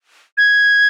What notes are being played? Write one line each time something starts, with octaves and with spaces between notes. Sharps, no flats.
G#6